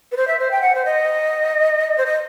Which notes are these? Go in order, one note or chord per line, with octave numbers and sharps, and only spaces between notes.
B4
C5
E5
C5
G5
F#5
C5
D#5
C5
D#5